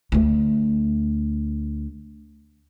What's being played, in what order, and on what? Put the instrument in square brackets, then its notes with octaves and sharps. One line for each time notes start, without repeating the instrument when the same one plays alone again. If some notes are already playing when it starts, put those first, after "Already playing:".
[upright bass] D2 A3